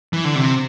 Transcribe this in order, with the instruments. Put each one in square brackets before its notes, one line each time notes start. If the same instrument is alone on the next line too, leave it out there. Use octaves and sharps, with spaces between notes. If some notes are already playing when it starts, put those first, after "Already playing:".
[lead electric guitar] E3
D3
C3